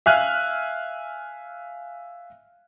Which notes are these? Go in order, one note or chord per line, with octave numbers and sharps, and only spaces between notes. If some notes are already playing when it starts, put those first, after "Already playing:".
E5 F5 G#5 F6 F#6